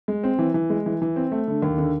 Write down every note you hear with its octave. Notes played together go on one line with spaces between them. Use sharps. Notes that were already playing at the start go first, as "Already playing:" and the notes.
G#3
C4
E3
E3
G#3
E3
E3
C4
A3
D3
D#2
D3